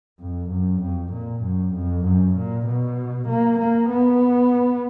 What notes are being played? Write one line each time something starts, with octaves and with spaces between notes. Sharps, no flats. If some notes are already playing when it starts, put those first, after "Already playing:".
F2
F#2
F2
A#2
F#2
F2
F#2
A#2
B2
A#3
A#3
B3